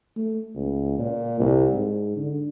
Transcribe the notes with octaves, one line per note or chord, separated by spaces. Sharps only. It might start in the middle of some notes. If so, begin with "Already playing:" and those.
A3
C#2
A#2
C2
G#2
D3